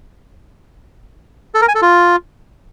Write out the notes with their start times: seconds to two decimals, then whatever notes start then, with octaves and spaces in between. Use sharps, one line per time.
1.54 A4
1.61 A#4
1.68 G#5
1.75 A4
1.82 F4